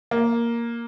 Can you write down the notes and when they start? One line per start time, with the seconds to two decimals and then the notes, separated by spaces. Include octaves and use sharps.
0.11 A#3